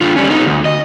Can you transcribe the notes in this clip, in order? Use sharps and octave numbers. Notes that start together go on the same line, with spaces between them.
D3 F4
G3 C#4
B3 D#4
D2
D#5